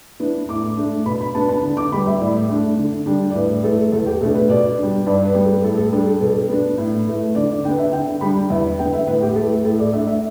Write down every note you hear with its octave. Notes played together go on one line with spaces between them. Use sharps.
E3 B3 D4
A2 D6
A3 D4
B2 B5
B5
B3 D4 A5
A5
D3
D6
G3 B3 B5
E5
A2 D5
A3 D4
D3
G3 D4
D5
A2 B4
E3 A3 A4
E2 A4
G4
B2 A3 D4 A4
B4
B2 D5
G3 D4
G2 D5
B4
G3 B3
A4
A2 A4
A4
G3 D4 A4
A4
B2 A4
B3 D4
A2
E3 A3
D3 D5
D5
D4 G5
B3
E5
D3 G5
G3 D4 B5
E2 E5
D3 B3 G5
E5
A2 B4
G4
E3 A3 A4
A4
A2 A4
D5
A3 D4 E5
E5